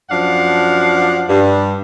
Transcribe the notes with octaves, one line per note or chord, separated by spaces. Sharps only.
F#2 F3 D4 F5 F#5
G2